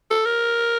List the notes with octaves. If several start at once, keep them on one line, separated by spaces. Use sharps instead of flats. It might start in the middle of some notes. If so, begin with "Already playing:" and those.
A4
A#4